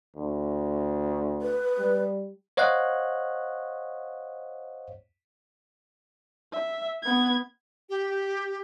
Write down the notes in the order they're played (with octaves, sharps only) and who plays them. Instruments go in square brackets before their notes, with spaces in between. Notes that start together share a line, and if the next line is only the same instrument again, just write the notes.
[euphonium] D2
[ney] B4
[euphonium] G3
[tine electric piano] C5 C#5 D#5 F5 F#5 F#6
[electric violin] E5
B3 G#6
[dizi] G4